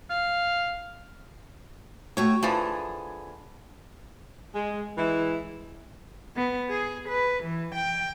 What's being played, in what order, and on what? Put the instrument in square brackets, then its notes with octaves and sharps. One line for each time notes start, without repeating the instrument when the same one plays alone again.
[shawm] F5
[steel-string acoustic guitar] A3 F#4 G5 [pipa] C#5
[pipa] D3 E3 F3 [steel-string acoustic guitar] G#4
[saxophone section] G#3
E3 G#3 E4
[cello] B3
G#4
B4
E3
G5